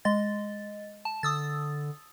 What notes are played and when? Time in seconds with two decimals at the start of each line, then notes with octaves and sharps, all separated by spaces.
0.05 G#3 D#5 A6
1.05 A5
1.23 D3 D#6 E6 A6